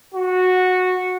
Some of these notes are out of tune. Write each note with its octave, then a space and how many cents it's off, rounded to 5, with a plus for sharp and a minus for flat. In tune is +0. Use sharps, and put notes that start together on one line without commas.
F#4 -10